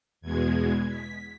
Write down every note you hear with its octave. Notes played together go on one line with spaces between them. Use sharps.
E2 B2 G#3 G#6
B6